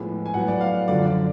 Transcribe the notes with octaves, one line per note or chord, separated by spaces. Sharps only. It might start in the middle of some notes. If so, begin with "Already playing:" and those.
Already playing: A2 F3 G#3 B3
G#5
A2 F#3 B3 F#5
D5
F5
F#2 D3 F3 D5
D5